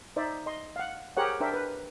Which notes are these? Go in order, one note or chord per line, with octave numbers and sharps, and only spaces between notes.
D#4 C5 D5 E5
D#5 C6
F5 F#5
G4 G#4 A#4 C5 C#5 F#5
D4 A#4 C5 E5 G5
B4